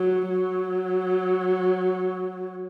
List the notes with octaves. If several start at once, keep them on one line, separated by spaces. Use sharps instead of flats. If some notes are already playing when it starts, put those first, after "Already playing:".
Already playing: F#3
F#3